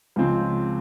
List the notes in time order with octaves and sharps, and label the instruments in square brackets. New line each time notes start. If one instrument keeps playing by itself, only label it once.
[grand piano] C#2 C#3 F3 C4